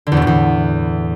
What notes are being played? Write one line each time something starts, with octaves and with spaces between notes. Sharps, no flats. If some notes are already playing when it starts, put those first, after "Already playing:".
D3
E2
B2
A2
E2